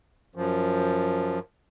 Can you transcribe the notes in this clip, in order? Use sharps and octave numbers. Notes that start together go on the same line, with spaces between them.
F#2 F3